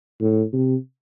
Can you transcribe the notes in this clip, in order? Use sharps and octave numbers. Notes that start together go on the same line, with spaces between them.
A2
C3